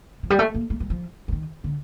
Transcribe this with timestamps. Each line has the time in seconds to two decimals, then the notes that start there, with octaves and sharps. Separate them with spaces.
0.23 F3
0.30 G3
0.39 A3
0.54 A#3
0.70 A3
0.80 G3
0.90 F3
1.28 F3
1.32 D#3
1.64 D3